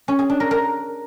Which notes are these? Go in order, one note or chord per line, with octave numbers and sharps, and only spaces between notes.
C#4
G#4
D4
A#4
A#4